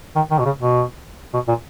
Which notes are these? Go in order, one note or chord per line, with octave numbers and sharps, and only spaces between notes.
D#3
D#3
B2
C#3
B2
B2
A#2